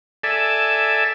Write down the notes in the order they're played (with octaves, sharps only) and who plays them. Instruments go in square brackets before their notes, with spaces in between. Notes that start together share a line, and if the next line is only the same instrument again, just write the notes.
[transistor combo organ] A4 D5 E5 G#5 A5